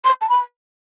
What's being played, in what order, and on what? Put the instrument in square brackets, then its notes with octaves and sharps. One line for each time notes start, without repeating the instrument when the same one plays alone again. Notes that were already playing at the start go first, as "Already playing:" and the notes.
[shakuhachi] C6
A5
B5